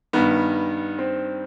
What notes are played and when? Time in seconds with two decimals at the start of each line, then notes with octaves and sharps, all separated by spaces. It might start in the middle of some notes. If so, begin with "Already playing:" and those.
0.13 G2 D#3 B3
0.99 C4